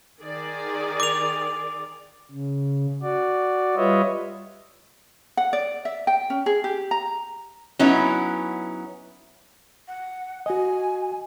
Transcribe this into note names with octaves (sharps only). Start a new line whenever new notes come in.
D#3 G#4 D5
D6 F7
C#3
F#4 D5
G3 F4 B4 C#5 D#5 E5
F#5
D5
E5
G5
C#4
G#4
G4
A#5
F#3 B3 C#4 D#4 E4
F#5
F#4 D#5 G#5